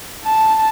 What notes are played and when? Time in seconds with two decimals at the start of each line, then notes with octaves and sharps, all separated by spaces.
0.25 A5